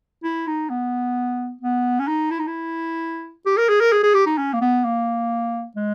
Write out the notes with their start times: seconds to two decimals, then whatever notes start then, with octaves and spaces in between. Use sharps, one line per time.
0.24 E4
0.47 D#4
0.70 B3
1.61 B3
1.99 C#4
2.08 D#4
2.31 E4
2.39 D#4
2.48 E4
3.46 G4
3.58 A#4
3.69 G#4
3.81 A#4
3.92 G#4
4.03 G#4
4.14 G4
4.26 D#4
4.38 C#4
4.53 A#3
4.61 B3
4.84 A#3
5.76 G#3